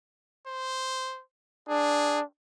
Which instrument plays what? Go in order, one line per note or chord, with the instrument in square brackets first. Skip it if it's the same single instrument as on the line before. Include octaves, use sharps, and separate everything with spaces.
[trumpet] C5
[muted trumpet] D4 [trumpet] G#4